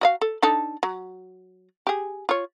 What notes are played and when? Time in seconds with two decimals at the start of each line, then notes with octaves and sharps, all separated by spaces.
0.01 F#4 D#5 F5
0.21 A4
0.42 D4 D#4 A4
0.83 F#3
1.87 G4 G#4
2.29 F4 C#5